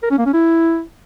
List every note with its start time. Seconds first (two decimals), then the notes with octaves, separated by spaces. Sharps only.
0.03 A#4
0.10 C#4
0.18 A#3
0.26 C#4
0.34 E4